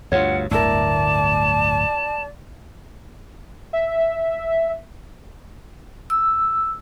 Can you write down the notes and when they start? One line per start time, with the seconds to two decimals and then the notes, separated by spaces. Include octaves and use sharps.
0.12 D2 G2 F4 C#5 F#5
0.51 D1 G1 D2 E4 A#4 D5 A5
3.73 E5
6.10 E6